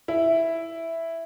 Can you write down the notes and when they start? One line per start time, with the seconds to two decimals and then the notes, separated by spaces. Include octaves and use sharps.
0.08 E4